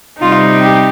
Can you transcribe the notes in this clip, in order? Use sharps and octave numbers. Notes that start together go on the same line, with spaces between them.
C3 G3 C4 D#4 F4
G4